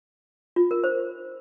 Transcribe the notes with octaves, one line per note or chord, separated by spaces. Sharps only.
F4
A#4
C5